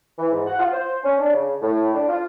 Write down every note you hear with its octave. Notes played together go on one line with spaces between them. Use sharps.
E3
G#2
F#5
F4
C5
C#4
D4
C#3
A2
D4
F4